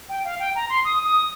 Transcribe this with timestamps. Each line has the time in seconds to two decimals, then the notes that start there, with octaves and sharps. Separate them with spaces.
0.09 G5
0.24 F5
0.39 G5
0.55 A#5
0.69 C6
0.85 D#6
1.04 D#6